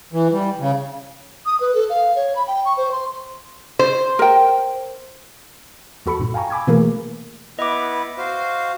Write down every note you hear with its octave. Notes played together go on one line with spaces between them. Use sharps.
E3
G3
C#3
D#6
B4
A4
F5
C#5
B5
G5
C#6
C5
C6
C5
A#4 G5
E2 F#4 A4 B5 C#6 C#7
G2 A#2
F5 G5 G#5 A#5 C#6
G#5 B5 D6 E6 G#6
B2 E3 A3 A#3 G#4 A#4
B3 E4 B4 D#5 D6
F#4 C5 F5